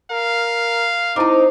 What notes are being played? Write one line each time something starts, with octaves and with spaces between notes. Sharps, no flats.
A#4 F5
C4 D#4 E4 D#5 A#5 D6